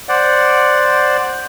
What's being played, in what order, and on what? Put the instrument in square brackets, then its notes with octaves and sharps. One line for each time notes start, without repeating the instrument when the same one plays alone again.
[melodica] C5 D5 F#5